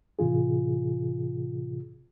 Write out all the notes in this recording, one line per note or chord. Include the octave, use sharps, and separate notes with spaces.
A2 C3 E3 F4 G#4